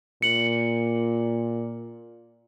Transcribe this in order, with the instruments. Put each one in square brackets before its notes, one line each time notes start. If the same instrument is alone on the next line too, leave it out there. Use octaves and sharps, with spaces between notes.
[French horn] A#2 [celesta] C#7 F#7